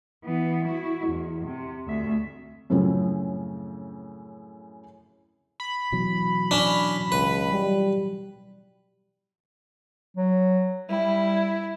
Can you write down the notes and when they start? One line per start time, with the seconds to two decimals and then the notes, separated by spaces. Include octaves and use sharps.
0.24 E3 B3
0.66 E4 F#4
1.07 E2
1.46 C3
1.87 D2 E5
2.70 F#2 A2 C#3 F3 C4 C#4
5.60 B5
5.92 B2 E3 F#3
6.51 C#4 D4
7.12 C#2 B4
7.52 G3
10.17 F#3
10.89 G3 E4